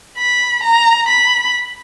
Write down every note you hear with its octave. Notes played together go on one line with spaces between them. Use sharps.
B5
A#5
B5